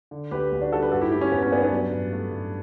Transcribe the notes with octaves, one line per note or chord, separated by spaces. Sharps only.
D3
D2 G4 B4
D2
D4 F#4
G3 F#4 A4
G4 B4
G2 F#4 A4
E4 G4
A3 E4 G4
C#4
G2 B3
C#4
G2 B3 D4
B3 D4
F#3
G2
A3
G2